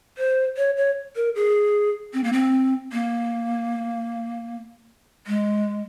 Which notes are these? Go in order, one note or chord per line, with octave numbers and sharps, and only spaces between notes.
C5
C#5
C#5
A#4
G#4
C4
A#3
C4
A#3
G#3